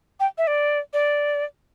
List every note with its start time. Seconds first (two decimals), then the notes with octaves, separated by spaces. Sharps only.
0.20 G5
0.38 E5
0.47 D5
0.93 D5